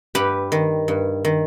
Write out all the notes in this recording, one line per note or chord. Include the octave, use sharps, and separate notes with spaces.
G2 G4 B4
D#3
G2
D#3